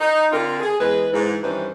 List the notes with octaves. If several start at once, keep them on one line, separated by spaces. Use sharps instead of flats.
D#4
D3 C4 F4 A#4
G#4
E2 G#3 G#4 B4
G#2 E3
G2 D#3 E3 C#4 B4 C5